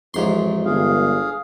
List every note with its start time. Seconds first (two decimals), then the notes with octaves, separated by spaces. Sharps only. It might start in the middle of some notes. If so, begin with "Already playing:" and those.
0.14 A1 F2 G#2 C6
0.65 G1 G#4 F5